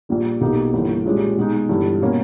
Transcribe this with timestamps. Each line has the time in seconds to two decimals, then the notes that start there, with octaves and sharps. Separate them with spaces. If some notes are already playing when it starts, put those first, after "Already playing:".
0.09 A#1 A#2 G3
0.41 B1 B2 A#3 D#4 G4
0.73 G1 G2 E3 A#3
1.05 A#2 G#3 C#4 G4
1.37 B2 G#3 D#4
1.69 G1 G2 E3 G3
2.01 B2 A#3 C#4